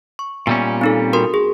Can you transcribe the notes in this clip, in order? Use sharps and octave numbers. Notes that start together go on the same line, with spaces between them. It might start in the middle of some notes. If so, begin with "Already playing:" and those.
C#6
A#2 G3 B3 C#4
C4 D#4 A4
F#4 A#4 C6
G#4